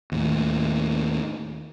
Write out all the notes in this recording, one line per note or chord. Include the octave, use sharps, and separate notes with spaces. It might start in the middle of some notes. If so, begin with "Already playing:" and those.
D#2 A2